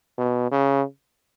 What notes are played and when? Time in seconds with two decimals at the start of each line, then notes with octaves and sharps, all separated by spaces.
0.18 B2
0.51 C#3